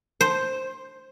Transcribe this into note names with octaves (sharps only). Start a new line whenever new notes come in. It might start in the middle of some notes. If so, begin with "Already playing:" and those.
C5